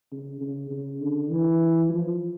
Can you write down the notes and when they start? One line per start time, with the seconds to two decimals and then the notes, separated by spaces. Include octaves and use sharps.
0.12 C#3
0.41 C#3
0.71 C#3
1.01 D3
1.30 E3
1.89 F3